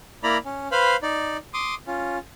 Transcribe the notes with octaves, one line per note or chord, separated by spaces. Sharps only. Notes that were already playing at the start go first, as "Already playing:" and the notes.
A#3 E4 D5 A#5 B5
C#4
B4 C5 F5 B5
D#4 D5
C6 D6 D#6
C#4 F4